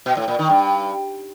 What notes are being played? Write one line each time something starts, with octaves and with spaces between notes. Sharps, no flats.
B2
A2
A#2
D#3
G2